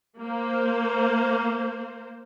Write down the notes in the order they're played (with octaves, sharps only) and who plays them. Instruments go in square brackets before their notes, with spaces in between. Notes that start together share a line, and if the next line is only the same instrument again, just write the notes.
[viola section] A#3 C5